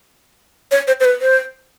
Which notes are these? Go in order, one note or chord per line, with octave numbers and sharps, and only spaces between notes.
C#5
C5
C5
B4
C5